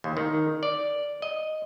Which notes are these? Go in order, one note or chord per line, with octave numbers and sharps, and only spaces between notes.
D#2
D#3
D5
D#5